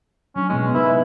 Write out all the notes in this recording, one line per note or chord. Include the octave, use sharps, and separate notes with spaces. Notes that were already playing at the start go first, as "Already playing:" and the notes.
F#3 C#4 D4
B2 G#3 B3 E4
C3 D#4 E4 B4